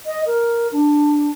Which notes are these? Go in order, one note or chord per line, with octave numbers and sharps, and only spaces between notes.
D#5
A#4
D4